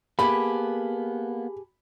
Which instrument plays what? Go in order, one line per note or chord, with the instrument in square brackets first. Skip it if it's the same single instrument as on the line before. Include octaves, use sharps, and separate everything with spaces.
[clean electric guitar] A#3 B3 [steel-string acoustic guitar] G4 G#4 A5 [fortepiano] B5